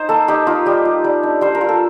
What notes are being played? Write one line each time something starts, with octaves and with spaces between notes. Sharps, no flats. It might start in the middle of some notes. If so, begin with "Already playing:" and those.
Already playing: D#4 C5
A#3 A4
D#4 G4
D#4 F4
G3 G4
F4
G3
D4
G3 C5
A#4
F4
A4